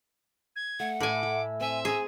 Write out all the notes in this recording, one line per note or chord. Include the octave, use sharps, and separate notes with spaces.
G#6
A3 F#5
A2 E5 G#5 B5 D6
E5
C4 E5 G#5
G#4 G#5 A#5